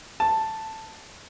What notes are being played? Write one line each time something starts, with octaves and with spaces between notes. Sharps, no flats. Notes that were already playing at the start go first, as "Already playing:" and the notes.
A5